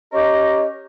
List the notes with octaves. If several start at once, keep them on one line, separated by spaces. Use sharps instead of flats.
C#4 G4 A#4 D#5